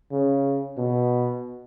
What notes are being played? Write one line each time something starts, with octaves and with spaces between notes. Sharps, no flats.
C#3
B2